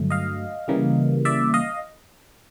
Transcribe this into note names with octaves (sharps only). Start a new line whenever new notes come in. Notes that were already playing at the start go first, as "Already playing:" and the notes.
Already playing: G2 D3 F#3 A3
D#5 F5
C#3 E3 G3 A#3
D5 E5
D#5 F5